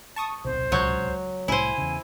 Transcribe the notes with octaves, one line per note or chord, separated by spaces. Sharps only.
A5 C#6 D#6
D1 B1 C3 C5
C#2 F#3 C#5 G6
C2 A2 E4 C5 G#5
E2 C#3